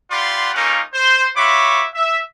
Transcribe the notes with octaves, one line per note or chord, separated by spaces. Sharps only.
F4 G4 D5 F#5 B5 C6
A3 A#3 C#4 D#4 F4 A#4
C5
F4 F#4 C#5 E5 B5 D6
E5